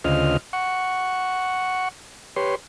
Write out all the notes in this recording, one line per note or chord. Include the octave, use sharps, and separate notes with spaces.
D2 C#3 F4 C5 D#5 F6
F#5 C#6
G4 B4 C#5 C6